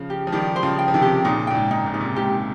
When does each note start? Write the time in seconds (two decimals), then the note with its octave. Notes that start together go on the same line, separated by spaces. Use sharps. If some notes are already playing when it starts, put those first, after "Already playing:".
Already playing: C#3 F3
0.10 G4
0.27 F3
0.32 D#3 G3 G4
0.56 C5
0.63 C#3 F3
0.79 G5
0.88 F3
0.94 C3 D#3
1.02 G4
1.25 A#2 C#3 D#4
1.47 A#2 G5
1.55 G#2
1.71 D#4
1.86 A#2
1.94 C3 D#4
2.00 A#2
2.16 G#2 G4